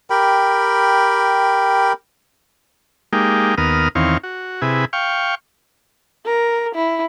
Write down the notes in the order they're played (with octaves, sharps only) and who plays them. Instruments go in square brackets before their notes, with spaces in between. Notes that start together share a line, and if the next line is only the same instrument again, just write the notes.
[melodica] G4 A#4 G5 B5
[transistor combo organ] G#3 A#3 D#4 G4
D#2 B3 A#4 D#6 F6
E2 D#3 C4 C#5 F5
F#4
C3 E4 G#4 B4
F5 G5 C#6
[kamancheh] A#4
E4